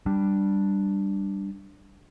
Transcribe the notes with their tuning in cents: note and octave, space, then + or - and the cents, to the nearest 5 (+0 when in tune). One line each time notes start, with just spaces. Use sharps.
G3 +0 D4 +0